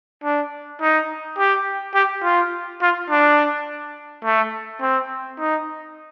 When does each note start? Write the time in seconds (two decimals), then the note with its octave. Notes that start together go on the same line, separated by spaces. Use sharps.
0.24 D4
0.81 D#4
1.38 G4
1.94 G4
2.23 F4
2.82 F4
3.10 D4
4.24 A3
4.81 C4
5.39 D#4